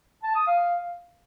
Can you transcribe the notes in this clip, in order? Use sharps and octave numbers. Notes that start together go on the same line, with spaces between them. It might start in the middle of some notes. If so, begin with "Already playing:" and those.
A5
D#6
F5